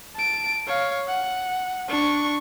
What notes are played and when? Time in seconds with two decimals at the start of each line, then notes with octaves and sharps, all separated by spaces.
0.16 A5 D7
0.67 C#5 F5
1.08 F#5
1.88 D4 C#6